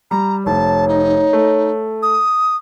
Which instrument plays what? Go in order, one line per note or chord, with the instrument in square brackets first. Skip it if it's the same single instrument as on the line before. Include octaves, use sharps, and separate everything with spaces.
[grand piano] G3 [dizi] A#5
[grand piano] F1 [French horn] C#5 [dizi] A5
[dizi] D#4
[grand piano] A3
[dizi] D#6